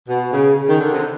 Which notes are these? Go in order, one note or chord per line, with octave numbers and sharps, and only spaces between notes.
B2
C#3
C#3
D#3
D3
C3